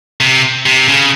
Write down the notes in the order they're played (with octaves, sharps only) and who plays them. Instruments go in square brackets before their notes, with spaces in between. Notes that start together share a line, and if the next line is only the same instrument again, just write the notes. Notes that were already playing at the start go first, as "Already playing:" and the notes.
[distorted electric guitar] C3
C3
C#3